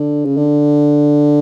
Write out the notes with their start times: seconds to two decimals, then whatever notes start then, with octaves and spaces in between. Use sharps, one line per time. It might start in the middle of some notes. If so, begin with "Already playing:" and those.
Already playing: D3
0.25 C#3
0.37 D3